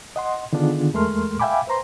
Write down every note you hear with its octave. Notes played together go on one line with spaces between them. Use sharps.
D#5 F#5 C6
D3 D#3 B3 D4 F4 G#4
E2 G#3 A3 A#4 C6 F6
E5 F5 G5 G#5 B5 D6
B4 C5 A#5 C6